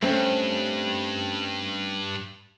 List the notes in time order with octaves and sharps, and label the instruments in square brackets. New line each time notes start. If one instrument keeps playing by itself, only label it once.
[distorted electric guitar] G2 [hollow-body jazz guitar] A3 C4 C#4